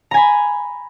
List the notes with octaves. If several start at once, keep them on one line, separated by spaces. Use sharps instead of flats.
G#5 A#5 B5